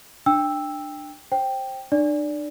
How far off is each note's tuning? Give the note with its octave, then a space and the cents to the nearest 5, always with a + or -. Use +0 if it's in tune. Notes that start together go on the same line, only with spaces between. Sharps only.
D4 +20 G5 +15 E6 +0
C5 +15 G5 +0
D4 +40 D5 -15